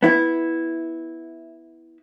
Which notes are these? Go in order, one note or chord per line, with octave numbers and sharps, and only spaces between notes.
B3 E4